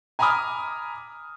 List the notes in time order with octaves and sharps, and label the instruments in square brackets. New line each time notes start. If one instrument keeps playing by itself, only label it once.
[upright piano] G#5 A#5 B5 D6 D#6 F6